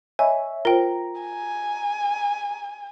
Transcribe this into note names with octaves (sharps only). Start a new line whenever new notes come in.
C#5 D#5 E5 G#5 B5
F4 A#4 C5 G5 A#5
G#5